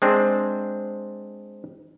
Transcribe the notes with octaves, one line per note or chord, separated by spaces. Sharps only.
G#3 C4 D4 C5